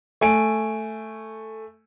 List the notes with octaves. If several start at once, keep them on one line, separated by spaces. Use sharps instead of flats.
A3 G#5 D7